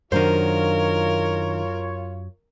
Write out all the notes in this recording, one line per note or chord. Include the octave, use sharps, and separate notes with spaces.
F#2 D#3 F#3 D4 F4 A#4 C5 C#5